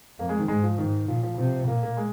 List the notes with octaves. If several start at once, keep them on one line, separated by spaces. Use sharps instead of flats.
F2 A#3
G#3
D#3
G#2 G#3
F3
G#2 D#3
A#2 F3
F3
C3 F3
A#2 A#3
A#3
G#3